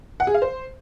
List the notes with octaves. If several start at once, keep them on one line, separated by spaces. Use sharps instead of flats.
F#5
G#4
F5
C5